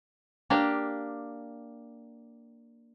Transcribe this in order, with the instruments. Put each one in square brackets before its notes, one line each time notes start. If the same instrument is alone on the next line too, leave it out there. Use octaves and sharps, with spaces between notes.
[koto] A#3 D4 G4